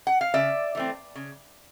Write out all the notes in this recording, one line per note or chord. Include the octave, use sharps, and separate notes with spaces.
F#5
F5
C#3 D5 E5
E3 A3 C4
C#3